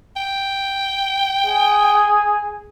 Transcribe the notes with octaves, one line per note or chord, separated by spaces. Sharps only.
G5
G#4